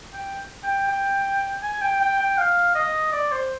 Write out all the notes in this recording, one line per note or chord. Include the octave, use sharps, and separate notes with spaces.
G5
G5
G5
G#5
G5
G5
G5
F5
D#5
D5
C5